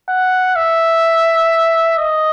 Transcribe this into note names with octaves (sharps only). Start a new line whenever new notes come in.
F#5
E5
D#5